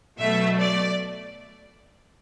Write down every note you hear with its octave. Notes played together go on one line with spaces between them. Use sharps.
B2 F#3 A3 E5
D5